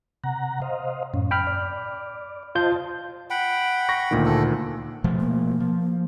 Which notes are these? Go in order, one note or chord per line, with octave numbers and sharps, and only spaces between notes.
C3 F#5 A#5
C5 D#5 F5
F#2 A2 C#4
F#2 G5 B5 F6
D5
F4 C5 D#5 A5 G6
F#5 G5 B5
C#6 A#6
D2 A#2 D#3
A4
B2 F3 A3
A#3
F3